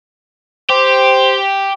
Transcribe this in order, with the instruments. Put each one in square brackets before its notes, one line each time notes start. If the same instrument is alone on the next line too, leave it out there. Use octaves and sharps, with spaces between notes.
[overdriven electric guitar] G4 [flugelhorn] C5